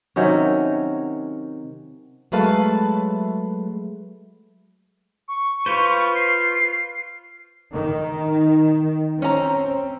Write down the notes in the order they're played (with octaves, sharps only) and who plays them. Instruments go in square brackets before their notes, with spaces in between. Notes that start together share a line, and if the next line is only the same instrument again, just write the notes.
[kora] C3 D#3 F#3 C#4
[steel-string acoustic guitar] F#3 G#3 A3 B4 F5 A5
[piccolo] C#6
[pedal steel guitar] F4 B4 C5
[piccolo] C7
[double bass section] D#3
[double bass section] C4 [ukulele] C#4 A#5